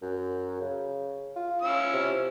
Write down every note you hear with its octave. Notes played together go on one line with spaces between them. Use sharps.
F#2
C#3
F4
C#4 E4 E6
C3